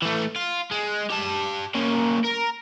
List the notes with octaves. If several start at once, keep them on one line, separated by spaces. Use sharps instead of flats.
E3 A3
F4
G#3
G4 A5
A#3 C#4
A#4